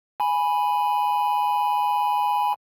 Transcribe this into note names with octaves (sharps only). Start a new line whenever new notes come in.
G#5 B5